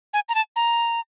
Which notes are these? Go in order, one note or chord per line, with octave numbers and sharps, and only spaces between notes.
G#5
A#5
A5
A#5